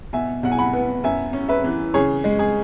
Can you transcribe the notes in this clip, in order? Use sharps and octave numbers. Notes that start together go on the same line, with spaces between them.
B2 E5 G#5
B1 F#5
G#5
F#5 B5
B3
F#2 E5 G#5
C#4
B4 E5
E3
C#3 G#4 C#5
G#3
G#4